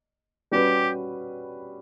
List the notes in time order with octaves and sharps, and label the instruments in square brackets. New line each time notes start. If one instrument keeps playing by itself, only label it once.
[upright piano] G3 C#4 F#4 B4 [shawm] G4